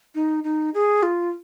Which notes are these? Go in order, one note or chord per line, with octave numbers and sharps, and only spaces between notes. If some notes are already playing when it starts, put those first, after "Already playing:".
D#4
D#4
G#4
F4